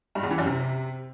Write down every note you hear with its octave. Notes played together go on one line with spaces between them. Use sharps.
G2
E2
E3
F#2
C3